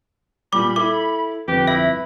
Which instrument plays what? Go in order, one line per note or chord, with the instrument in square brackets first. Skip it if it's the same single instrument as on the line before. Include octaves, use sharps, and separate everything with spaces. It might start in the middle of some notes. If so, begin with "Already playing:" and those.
[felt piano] A#2 G3 [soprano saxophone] B5 [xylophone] D6
[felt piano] E4 A4 [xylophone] D6
[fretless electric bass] G1 F2 [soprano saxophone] G4 [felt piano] B4
[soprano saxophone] E4 [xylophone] E5